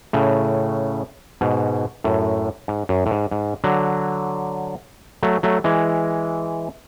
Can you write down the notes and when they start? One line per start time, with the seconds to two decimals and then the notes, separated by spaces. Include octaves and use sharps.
0.13 A2 C#3
1.41 G#2 B2
2.04 F#2 A2
2.68 G#2
2.89 F#2
3.06 A2
3.11 G#2
3.31 G#2
3.64 D3 F#3
5.23 F#3 A3
5.43 F#3 A3
5.64 E3 G#3